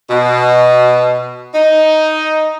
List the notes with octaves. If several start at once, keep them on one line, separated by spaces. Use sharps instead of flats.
B2
D#4